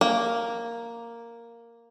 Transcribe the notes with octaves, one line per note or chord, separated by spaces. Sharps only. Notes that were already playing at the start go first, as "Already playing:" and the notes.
A#3